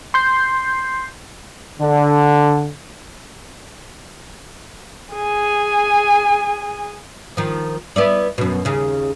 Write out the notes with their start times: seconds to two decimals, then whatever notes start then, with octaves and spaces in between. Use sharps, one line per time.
0.14 C6 G6 C7
1.79 D3
5.14 G#4 G#5
7.37 D#3 F3
7.96 B3 E4 D5
8.38 F#2 B2
8.65 D#2 C#3